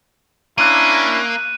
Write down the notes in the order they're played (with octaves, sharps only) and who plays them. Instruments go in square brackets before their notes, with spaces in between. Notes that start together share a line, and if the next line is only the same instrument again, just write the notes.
[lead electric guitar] A#3 [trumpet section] C#4 D4 E4 [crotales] F#6 D#7